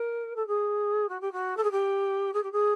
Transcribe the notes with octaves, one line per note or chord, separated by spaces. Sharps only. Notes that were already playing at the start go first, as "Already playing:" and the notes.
Already playing: A#4
A4
G#4
F#4
G4
F#4
A4
G#4
G4
G#4
G4
G#4